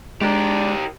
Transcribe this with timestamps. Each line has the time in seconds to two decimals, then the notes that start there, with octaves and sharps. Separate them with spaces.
0.21 G#3 D4 G4 A#4